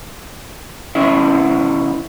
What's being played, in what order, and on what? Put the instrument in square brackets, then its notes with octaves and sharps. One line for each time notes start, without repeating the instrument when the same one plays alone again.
[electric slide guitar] B2 D#3 C#4 E4 E5